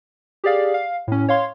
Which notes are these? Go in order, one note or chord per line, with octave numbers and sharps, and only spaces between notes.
G4 G#4 D5 F5
F5
A2 C#4
C#5 F5 C6